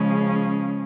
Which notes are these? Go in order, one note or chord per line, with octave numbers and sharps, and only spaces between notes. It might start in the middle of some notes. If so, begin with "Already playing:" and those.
Already playing: C#3 F3 G#3 C#4